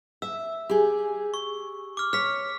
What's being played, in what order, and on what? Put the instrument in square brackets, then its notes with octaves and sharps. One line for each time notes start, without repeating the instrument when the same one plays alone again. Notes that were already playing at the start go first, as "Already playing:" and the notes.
[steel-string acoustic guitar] E5 [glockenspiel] E6
[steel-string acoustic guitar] G4 G#4
[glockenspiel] C#6
D6 F6
[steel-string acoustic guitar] C#5 [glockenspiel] F6 B6